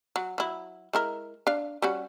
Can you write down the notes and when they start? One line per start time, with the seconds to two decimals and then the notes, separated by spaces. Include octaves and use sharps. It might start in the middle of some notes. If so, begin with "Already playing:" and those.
0.16 F#3
0.38 F#3 E4
0.93 G#3 E4 A#4
1.47 D4 F5
1.82 G3 C#4 F#4